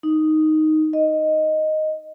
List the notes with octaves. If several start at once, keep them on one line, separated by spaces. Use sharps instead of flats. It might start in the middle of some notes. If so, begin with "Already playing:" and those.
D#4
D#5